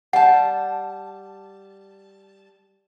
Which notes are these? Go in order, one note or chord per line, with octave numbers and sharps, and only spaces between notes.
G3 F#5 A5